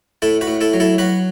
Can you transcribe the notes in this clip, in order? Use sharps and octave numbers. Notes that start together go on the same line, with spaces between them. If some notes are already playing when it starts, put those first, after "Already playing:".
A2 E4 A4
F#4 B4
A2
E4 A4
F#3
E4 A4
F#3 F#4 B4